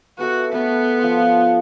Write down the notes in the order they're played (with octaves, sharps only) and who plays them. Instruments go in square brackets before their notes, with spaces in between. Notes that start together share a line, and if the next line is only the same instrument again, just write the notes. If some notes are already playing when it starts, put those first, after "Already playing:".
[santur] B3 A4 E5 [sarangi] F#4
[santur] A3 D4 B4 [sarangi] B3
[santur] F3 G5 C6